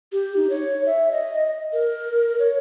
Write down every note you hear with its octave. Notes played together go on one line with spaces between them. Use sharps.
G4
D#4
C#5
E5
D#5
A#4
C#5